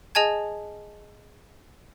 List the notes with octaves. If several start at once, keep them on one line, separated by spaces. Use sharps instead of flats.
G#4 D#5 G#5 A5 G#6